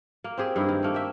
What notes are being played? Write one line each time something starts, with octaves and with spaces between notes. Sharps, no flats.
A#3
C4 G4 G#4
G2 D#4 E4
D#3
A3 A#3
G4 E5